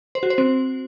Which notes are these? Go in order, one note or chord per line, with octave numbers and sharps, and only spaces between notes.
C5
F#4
C5
C4